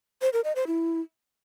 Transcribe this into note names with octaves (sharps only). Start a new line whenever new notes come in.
C5
A#4
D#5
C5
E4